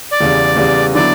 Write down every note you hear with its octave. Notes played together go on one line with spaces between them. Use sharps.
D5
E2 C#3 G3
E2 C#3 G3
D3 F#3 B3 E4 D5